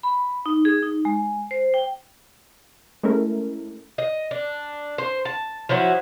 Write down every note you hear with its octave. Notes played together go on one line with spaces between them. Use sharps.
B5
D#4
G#4
D#4
G#3
C5
G5
G#3 A3 C#4 E4 A#4
D#5
D4
C5
A5
F3 F#3 E4 F#4